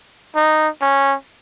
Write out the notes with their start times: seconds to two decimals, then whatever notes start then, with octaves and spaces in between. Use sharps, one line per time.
0.36 D#4
0.82 C#4